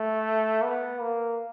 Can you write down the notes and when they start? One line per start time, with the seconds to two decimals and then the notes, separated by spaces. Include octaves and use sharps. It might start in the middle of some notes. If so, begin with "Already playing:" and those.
Already playing: A3
0.63 B3
1.01 A#3